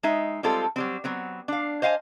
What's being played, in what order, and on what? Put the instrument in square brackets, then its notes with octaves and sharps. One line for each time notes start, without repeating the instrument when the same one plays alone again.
[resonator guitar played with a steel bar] G#3 D#4 E5
G3 G#3 C4 F4 A4
F#3 G3 C4
F#3 B3 C4
D4 F5
C5 D#5 F5 G5 G#5